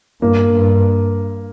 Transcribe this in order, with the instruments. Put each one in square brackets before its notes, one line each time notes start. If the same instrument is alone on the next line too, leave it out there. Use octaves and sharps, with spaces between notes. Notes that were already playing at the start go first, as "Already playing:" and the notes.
[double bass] G2 [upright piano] A#3
[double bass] G2